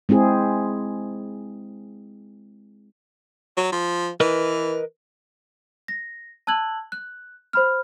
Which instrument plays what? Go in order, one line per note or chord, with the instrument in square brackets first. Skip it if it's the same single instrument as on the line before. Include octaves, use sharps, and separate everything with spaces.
[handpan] G#3 C4 E4 G#4
[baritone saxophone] F#3
F3
[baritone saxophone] E3 [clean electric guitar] A#4 B4 D#5
[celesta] A#6
A5 E6 F#6 G#6 F#7
F#6
C5 B5 F6